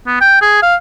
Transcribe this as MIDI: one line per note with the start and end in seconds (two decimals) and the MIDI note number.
0.07 0.18 59
0.21 0.39 79
0.42 0.60 68
0.63 0.76 77